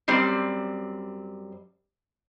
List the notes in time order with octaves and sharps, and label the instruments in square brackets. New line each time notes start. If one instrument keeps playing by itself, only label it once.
[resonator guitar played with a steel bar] F#2 G3 C4 D5